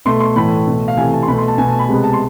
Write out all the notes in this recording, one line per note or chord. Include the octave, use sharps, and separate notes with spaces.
B2 A3 C6
C6
A2 E3 A3 B5
B2 A3
F5
C3 E3 A3 G#5
A5
C6
B2 A3 B5
C6
A5
B2 A3 G#5
A5
B5
C3 G#3 B3
A5
C6